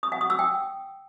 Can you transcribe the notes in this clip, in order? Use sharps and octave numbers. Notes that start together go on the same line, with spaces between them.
D#6
F#5
D#6
E6
G5